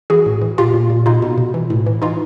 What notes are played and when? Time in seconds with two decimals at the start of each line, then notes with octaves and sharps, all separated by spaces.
0.10 E3 F#4 G#4
0.26 A2
0.42 E3
0.58 A#2 F4 G4
0.74 A#2
0.90 A#2
1.06 B2 D#4 F4
1.22 B2
1.38 B2
1.54 E3
1.70 A2
1.86 E3
2.02 E3 D#4 F4